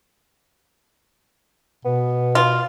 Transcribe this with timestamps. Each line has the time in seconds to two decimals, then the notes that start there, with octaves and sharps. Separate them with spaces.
1.85 B2 B3
2.35 F4